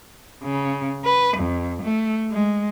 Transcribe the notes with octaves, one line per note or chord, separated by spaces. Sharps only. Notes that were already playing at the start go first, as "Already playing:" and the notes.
C#3
B4
F2
A3
G#3